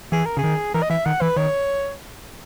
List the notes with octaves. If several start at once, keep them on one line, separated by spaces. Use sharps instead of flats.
E3 G#4
A#4
C#3 G#4
D#3
E3 A#4
D#5
E3 E5
D#3 F#5
E3 B4
D#3 C#5